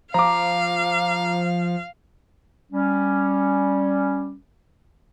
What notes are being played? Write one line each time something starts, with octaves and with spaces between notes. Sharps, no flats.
F3 F5 A#5 D6
G3 C#4